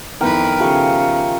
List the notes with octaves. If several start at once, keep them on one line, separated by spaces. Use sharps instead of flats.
F2 D#3 B3 E4 A#4 B4 G5
C#3 F3 A3 G4